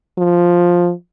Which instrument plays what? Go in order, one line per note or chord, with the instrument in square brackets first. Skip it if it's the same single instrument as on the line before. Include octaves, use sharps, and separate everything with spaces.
[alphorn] F3